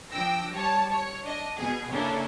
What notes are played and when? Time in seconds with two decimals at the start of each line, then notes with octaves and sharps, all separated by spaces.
0.11 F3 D4 G5 E6 A#6
0.54 G3 C#5 A5
0.90 C#5
1.23 D4 D#5
1.56 B2 G#4
1.91 C#3 A#3 C#4 D4 E4 A4